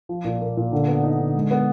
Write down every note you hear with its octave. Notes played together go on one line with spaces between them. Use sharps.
F3
A#2
A#3
A#2
D3
B3
D#4
D3
G#3
B3